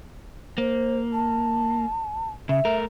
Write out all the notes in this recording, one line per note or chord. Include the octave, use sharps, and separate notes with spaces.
A#3 C5
A5
C#3 E5
A3 A#4